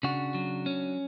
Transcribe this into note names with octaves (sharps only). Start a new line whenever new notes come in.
C#3 D4 F#4
F#3
C#4